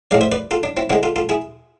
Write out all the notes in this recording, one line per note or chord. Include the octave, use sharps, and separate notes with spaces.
A2 G#3 D5 F5
C5 E5
B4 D5
F4 A4
D4
C4 E4
D3 G#3 C4 E4
F4 A4
F4 A4
E4 G#4